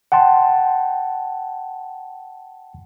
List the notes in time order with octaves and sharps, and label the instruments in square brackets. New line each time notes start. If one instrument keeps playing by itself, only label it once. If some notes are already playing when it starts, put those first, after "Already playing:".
[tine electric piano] F#5 G5 A5 C6